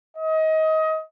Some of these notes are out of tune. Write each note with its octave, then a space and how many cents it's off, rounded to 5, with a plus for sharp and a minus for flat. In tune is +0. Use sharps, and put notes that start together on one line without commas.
D#5 +25